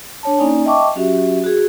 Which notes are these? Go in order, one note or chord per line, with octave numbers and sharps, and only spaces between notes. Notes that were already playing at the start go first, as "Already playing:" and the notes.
D4 C#5 A5
A#3 C#4 D#4 D5 G#5
D#5 E5 G5 A5 C#6 D6
F#3 C#4 F#4 G4 E5
F#4 G#4